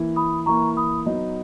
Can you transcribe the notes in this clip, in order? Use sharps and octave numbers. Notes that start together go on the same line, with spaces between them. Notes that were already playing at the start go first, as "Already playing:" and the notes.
Already playing: E3 A#3 E4
B5 D#6
E3 A#3 E4 A#5 C#6
B5 D#6
F#3 B3 D#4